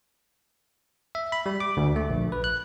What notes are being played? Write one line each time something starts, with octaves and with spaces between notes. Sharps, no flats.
E5
B5
G3
D6
D2
A3
A#1
B4
F#6